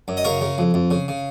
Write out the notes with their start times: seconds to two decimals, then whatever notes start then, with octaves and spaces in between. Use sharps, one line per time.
0.08 F#2
0.17 D#5
0.24 C#3 A#4 C#5
0.41 C#3
0.58 F2
0.74 F2
0.91 C#3
1.08 C#3